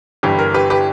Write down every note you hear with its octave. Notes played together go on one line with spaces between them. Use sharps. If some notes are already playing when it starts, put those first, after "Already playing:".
G1 G2 E3 G3 G4
A#4
G4 B4
G4 B4